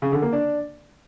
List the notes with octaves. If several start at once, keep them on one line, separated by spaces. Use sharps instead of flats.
C#3
D3
A#3
D4